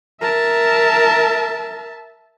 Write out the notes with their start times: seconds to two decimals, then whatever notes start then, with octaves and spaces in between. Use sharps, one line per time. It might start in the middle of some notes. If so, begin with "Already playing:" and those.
0.21 A#4 E5 A5